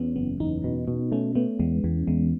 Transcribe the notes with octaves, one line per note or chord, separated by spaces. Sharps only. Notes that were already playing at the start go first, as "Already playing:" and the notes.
Already playing: E2 B3 C#4
F#1 B3
E2 D#4
B2
B2
A3 C#4
A3 B3
E2 G#3
E2 E3
E2 G#3